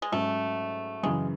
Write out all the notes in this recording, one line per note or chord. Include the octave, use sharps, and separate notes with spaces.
G#3
G#2 F#3 A3 C#4
F#2 C#3 E3 G#3